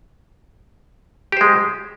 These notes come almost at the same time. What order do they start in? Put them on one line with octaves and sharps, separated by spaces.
G4 C5 G#3